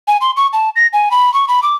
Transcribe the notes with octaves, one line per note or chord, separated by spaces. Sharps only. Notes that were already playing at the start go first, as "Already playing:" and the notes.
G#5
C6
C#6
A5
A#6
G#5
B5
C#6
B5
D6